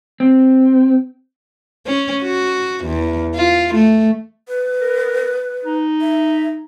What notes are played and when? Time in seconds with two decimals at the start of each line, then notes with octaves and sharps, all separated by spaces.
0.20 C4
1.87 C#4
2.24 F#4
2.85 E2
3.35 F4
3.74 A3
4.48 B4
4.81 A#4
5.65 D#4
6.01 E5